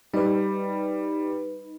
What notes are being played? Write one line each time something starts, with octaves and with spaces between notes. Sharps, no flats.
G3 D#4 B4